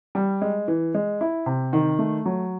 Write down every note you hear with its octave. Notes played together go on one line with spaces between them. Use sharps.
G3
G#3
E3
G#3
E4
C3
D#3
A3
F#3